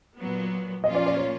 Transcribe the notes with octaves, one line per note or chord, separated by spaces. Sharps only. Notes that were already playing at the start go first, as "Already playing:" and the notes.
A#2 F#3 B3
A#2 F3 A#3 C#4 F4 D#5
D5
D5
C#5